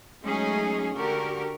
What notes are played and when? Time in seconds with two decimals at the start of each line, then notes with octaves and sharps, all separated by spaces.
0.24 F#3 G#3 A3 C#4 D#4 G#4
0.95 D3 F#4 G4 A#4